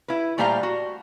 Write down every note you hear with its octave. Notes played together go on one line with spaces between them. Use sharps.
E4 B4
A#2 G3 A3 C5 F5 A#5
F#4